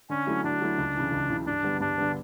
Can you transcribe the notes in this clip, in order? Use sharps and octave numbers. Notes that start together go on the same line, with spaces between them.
D3 C#4
F#3 A3 E4
D3 D4
F#3 A3 E4
C#2
C#3 E3
C#2
C#3 E3
G2 D4
D3 G3 B3
G2 D4
D3 G3 B3